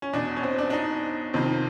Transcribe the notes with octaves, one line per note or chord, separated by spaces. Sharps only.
C#4
E2 B2 D4
C#4
C4
D4
D4
D#4
F2 C3 D#3